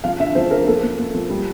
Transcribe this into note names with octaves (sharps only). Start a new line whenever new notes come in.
F3 F5
D3 E5
F3 C5
D3 A#4
A#3 A4
A#3
A#3
F3
G3